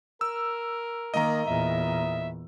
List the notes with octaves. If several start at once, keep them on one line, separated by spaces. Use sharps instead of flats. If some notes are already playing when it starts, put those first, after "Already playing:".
A#4 E6
D#3 A#3 D#5 A#5
E2 A#2 E5